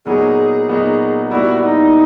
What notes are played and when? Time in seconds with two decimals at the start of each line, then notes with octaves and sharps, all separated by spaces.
0.05 A#2 F#3 B3 D#4 F#4 G#4
0.68 A#2 F#3 B3 D#4 F#4
1.30 A#2 G3 B3 E4 F#4
1.62 D#4